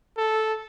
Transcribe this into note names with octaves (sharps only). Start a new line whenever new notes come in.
A4